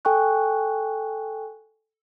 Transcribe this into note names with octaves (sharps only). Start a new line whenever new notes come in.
A4 G5 G#5 C#6 F#6